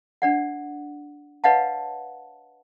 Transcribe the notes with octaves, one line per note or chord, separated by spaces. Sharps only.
D4 D5 F#5
B4 C#5 D#5 F5 F#5 A5